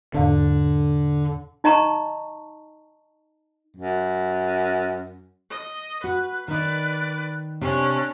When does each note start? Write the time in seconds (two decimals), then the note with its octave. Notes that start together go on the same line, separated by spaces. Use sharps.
0.14 E2 G#2 B2 D3
1.64 D#4 D#5 A5 A#5 C#6
3.77 F#2
5.51 D#5
6.04 F#4 B4
6.48 D#3 D#4 B4 D5
7.61 C3 C#4 D4